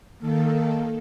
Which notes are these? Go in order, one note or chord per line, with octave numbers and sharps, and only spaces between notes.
D#3 A#3 A4